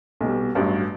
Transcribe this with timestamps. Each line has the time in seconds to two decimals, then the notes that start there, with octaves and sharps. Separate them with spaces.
0.21 B1 B2 G3
0.55 A1 G2 F#3